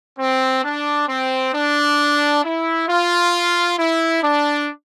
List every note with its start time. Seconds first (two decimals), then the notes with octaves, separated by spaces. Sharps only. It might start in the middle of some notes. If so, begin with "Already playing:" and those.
0.19 C4
0.64 D4
1.09 C4
1.54 D4
2.44 E4
2.89 F4
3.79 E4
4.23 D4